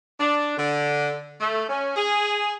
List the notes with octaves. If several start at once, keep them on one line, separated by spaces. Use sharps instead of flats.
D4
D3
A3
C#4
G#4